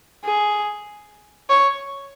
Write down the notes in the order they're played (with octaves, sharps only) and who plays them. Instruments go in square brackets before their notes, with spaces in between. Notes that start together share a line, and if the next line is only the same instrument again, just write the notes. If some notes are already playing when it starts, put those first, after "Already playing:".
[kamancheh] G#4
C#5